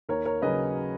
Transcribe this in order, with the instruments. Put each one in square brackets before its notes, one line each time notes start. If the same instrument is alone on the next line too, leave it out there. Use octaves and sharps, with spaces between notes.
[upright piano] D#2 A#4 C#5
A#4 C#5
C#3 F#3 B4 D#5